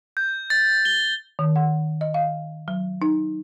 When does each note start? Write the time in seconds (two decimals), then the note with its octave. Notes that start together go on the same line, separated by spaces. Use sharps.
0.17 G6
0.50 A6
0.85 G7
1.39 D#3
1.56 F#5
2.01 D#5
2.14 F5
2.68 F#3
3.02 D#4